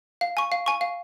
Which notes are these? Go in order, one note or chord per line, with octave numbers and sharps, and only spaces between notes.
F5
G#5 C#6
F5
G#5 C#6
F5